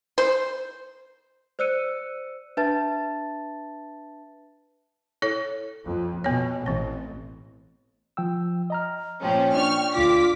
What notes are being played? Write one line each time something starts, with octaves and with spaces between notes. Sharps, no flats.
C5
C5 D5 E6 F#6 C#7 D#7
D4 B4 E5 A5 A6
E4 A4 C#5
F2
B2 B3 C#5
A1 E3 C4
F3 G5 E6
D#5 A#5 F6
A#2 F3 C#4 G5
D4 D5 C#6 F6
D2 F4 D6 B6